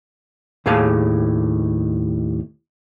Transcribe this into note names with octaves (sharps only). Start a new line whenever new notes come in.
D#2 A2 G#4 F5 G#5 A5